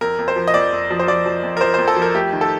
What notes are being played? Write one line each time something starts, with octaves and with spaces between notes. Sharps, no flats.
F2 A#4
F2
C5
F3
D#5
F2 D5
F2
F3
C5
F3 D5
F3
F2
A#4
F3 C5
F2 C5
A4
F3
A#4
A3 G4
D#3
A4